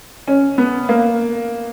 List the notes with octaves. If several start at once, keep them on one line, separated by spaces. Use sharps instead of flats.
C#4
B3
A#3